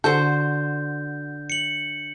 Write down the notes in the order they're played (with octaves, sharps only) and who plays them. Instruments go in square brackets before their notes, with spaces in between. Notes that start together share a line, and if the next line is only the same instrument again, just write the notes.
[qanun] D3 F#4 C5 [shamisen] A4 [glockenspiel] G6
[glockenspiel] C#7 F#7